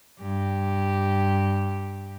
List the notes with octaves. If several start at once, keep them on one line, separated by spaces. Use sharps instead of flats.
G2 G4